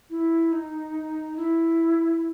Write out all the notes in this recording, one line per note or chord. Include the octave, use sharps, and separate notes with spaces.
E4
D#4
E4